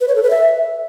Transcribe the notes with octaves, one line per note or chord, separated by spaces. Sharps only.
B4
C#5
A4
B4
E5